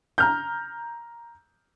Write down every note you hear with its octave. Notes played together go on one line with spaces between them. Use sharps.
A#5 F6 G6